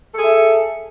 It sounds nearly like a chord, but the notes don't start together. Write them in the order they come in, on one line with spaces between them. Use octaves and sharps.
A4 G#4 E5